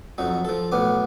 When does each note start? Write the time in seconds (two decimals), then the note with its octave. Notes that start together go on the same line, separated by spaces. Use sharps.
0.18 F2 F#3 D#4
0.45 F3 A4
0.72 B1 A2 B3 D6